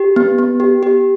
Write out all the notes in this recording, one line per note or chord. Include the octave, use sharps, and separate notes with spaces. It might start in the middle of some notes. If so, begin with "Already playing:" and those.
Already playing: G4
B3
B3
G4
G4